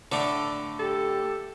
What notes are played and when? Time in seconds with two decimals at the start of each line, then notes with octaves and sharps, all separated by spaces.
0.12 A2 D3 A3 D5
0.79 G4 A4